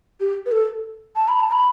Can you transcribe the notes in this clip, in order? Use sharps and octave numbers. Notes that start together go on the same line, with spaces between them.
G4
B4
A4
A5
B5
A5
B5